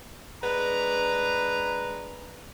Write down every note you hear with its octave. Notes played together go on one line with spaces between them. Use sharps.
G#3 D4 B4 A#5